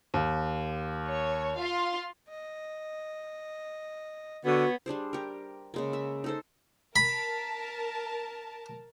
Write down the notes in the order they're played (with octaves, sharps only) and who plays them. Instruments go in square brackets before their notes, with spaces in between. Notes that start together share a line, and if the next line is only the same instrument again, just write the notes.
[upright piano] D#2
[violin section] C#5
F4 F5 C6
[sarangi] D#5
[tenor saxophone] D3 [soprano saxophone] B3 [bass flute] F#4 [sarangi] C#5
[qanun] G3 D4 G#4 C5
G4 A#4
C#3 G#3 A#3
E5
D#4 A4 C5
[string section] A#4 A5 [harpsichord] B5